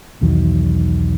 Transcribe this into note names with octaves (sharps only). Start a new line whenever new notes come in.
B1 E2 D#3 F#3